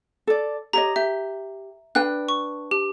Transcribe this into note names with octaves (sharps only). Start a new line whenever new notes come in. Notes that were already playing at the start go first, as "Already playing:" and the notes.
A4 D5
G4 C#5 D#5 A#5
G4 E5
D4 B4 G5 F#6
C#6
G4